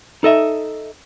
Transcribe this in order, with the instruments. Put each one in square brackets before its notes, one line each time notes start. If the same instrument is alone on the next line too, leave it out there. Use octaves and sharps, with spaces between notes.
[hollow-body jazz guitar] D#4 A4 D#5 E5